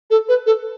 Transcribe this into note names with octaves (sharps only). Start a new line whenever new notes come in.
A4
B4
A4